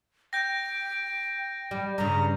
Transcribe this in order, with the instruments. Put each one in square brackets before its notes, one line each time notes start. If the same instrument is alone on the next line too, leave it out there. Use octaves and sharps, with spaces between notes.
[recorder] G5 [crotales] G6 A#6
[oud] G3
[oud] G2 C#3 [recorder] A#5